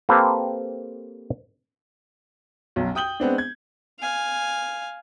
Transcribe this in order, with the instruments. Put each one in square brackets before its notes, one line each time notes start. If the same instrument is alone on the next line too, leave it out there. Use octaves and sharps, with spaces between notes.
[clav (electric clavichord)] A#3 C4 G4 A4 B4 C5
[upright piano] B1 F#2
G5 D#6 G6 F#7 G7
G#3 B3 C4 D4
G#6
[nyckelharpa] F5 G#5